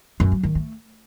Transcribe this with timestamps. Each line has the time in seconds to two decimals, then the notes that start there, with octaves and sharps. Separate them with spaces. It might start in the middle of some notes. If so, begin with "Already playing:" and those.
0.20 F#2
0.32 F#3
0.43 D#3
0.55 A3